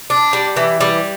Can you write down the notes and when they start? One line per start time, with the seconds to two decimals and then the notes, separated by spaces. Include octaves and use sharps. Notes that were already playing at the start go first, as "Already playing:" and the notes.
0.10 D4
0.33 G3
0.57 E3
0.81 G3